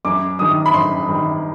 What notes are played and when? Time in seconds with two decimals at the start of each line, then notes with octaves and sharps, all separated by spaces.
0.05 F#2 D6
0.39 D#3 G3 D#6
0.66 B5
0.73 F#2 C6
1.08 D#3 G3